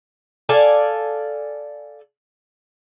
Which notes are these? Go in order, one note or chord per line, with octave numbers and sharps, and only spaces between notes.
A4 D5 F5 G#5